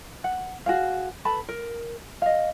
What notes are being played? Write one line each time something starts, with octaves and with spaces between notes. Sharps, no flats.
F#5
F#4 G#4 F5
A4 B4 A5 B5
A#4
D#5 F5